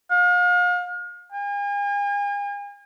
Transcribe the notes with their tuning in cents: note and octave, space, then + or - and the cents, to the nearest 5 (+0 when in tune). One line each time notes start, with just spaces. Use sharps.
F5 +40
G#5 -40